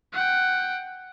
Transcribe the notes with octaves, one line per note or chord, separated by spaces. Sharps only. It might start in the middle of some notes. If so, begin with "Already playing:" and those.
F#5 G5